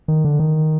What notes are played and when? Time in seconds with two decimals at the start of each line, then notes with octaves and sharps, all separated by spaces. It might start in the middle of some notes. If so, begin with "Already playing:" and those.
0.08 D#3
0.25 D3
0.39 D#3